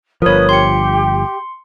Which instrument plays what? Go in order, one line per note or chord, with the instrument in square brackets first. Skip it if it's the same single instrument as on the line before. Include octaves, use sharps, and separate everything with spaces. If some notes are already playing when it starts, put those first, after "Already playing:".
[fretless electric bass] G1 F3 [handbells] A#4 C#5 [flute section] B4 D#6
[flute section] G4 [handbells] C6 C#7